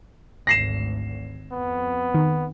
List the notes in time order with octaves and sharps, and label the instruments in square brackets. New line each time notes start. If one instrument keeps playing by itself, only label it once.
[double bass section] G#1 D2 [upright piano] A#6 C7 E7
[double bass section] F2 [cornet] B3
[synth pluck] D#3